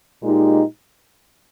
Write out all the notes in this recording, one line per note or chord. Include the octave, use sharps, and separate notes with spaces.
A#2 G#3 D#4 G4